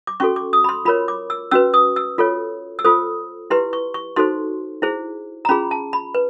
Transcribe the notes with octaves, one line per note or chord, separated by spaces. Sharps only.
D6
C#4 F#4 A4 C#6
D6
D#6
B5
C6
F4 A#4 C#5 B5
D6
E6
C#4 F#4 B4 E6
D#6
E6
F4 A4 C#5
E6
F4 A4 C5 D#6
E4 G4 B4 C6
C#6
C#6
D#4 F#4 A4 C5 C6
E4 G#4 C5
A#5
C#4 F4 G#4 B5
A5
B5
B4